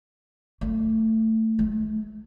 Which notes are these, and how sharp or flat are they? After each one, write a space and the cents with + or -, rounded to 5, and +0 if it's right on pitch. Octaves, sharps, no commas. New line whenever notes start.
A3 +15
A3 -35